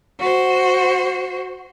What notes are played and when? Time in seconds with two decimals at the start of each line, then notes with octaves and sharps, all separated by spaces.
0.19 F#4 C5